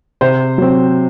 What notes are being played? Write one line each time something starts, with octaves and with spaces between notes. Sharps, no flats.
C3 C5
F#3 C4